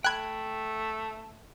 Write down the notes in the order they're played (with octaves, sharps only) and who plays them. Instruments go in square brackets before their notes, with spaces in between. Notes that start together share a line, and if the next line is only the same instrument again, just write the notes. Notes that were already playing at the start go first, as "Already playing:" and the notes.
[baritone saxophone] A3 [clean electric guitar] G5 B5 [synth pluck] F#6 G#6